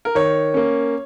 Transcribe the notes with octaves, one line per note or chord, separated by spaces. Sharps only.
A#4
D#3 C#5
A#3 C#4